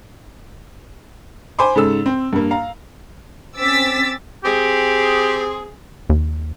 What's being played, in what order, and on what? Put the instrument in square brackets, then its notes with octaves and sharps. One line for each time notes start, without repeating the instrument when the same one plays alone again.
[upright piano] C5 G#5 B5 C6 D6
G#2 C#3 A4 E6
C4
G2 A#3
F5 A#5
[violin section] C4 C#4 D6 E6 A6 B6
[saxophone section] C4 G#4 [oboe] G4
[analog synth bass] D#2